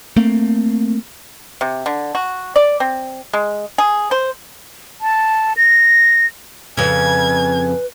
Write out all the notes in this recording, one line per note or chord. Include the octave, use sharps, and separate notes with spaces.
A3 A#3 C4
C3
D3
F#4
D5
C4
G#3
G#4
C5
A5
A#6
F2 C#3 B4 G#5 G#6